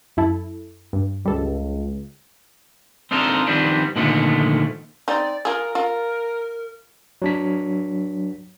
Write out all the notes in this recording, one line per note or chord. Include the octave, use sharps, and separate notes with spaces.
F#2 E4 A4
G2
C#2 G3 A4
C4 D4 D#4 F4 A4 A#4
D#3 F3 G3 B3 C4 D4
A#2 D3 D#3 F3 G#3 A3
C4 D#4 D5
F4 G#4 A#4
F4 A#4
F#3 D4 B6